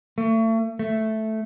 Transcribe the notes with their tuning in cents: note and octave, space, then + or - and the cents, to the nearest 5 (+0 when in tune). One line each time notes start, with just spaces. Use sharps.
A3 +35
A3 -5